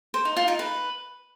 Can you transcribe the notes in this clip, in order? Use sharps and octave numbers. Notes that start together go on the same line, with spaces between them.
C5
D#4
F4
D#4
B4